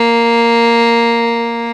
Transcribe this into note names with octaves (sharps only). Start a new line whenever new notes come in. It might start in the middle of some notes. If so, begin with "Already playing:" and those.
Already playing: A#3